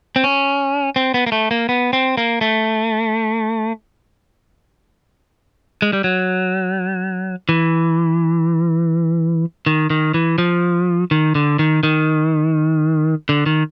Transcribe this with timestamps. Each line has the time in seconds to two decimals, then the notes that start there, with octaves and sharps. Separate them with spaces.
0.16 C4
0.24 C#4
0.96 C4
1.14 B3
1.27 A#3
1.32 A3
1.51 A#3
1.69 B3
1.93 C4
2.17 A#3
2.41 A3
5.82 G#3
5.93 G3
6.04 F#3
7.49 E3
9.66 D#3
9.90 D#3
10.14 E3
10.38 F3
11.11 D#3
11.35 D3
11.59 D#3
11.83 D#3
13.29 D3
13.46 D#3